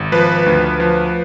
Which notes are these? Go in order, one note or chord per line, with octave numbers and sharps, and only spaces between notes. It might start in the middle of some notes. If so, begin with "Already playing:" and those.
Already playing: G#1
F3 B4
D2
F3